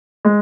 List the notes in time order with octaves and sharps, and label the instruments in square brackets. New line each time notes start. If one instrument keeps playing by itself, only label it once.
[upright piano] G#3